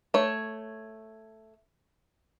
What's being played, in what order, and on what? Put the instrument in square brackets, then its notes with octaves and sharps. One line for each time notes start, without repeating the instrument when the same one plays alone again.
[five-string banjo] A3 C#5